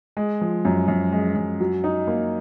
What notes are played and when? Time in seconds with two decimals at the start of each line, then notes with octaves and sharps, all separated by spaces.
0.17 G#3
0.41 F3
0.65 F#2
0.88 F#2
1.12 G#3
1.36 F#2
1.61 F#3
1.84 D#4
2.08 A#3